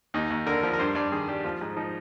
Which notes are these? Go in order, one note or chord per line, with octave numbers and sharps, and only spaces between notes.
D#2 D#4
D#2
D3 A#4
F3
A#4
G2 C5
G2 D5
D#3 G#4
G3 G4
F3 F4
G#2
F3 D#4